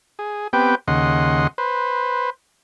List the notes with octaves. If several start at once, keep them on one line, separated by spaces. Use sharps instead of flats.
G#4
B3 C4 G4 B4 G5
D#2 C#3 D#5 F#5 C6
B4 C5